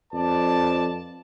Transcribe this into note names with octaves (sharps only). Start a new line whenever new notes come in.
F2 B4 D5 A5